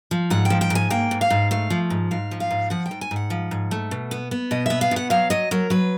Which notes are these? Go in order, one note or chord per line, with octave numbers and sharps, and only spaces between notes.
F3
G#2 F#5
G5
F3
G5
G#2
G#5
A#3 G5
G#2
F5
G#2
A3 F5
F3
G#2
G#2 F5
F3
F5
G#2
F3 F#5
G5
G#2
G#5
G#2
F#5
F3
G#2
A3
B2
B3
B3
B2 D#5
B3 E5
F5
B2 F#5
F#3 F5
F#3 D#5
F#3 A#4
F#3 B4